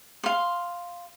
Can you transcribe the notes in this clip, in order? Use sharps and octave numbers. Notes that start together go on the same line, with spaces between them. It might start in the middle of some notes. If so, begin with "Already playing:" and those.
F5 C6